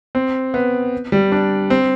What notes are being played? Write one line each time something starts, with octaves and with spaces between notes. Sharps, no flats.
C4
B3
G3
D4
C4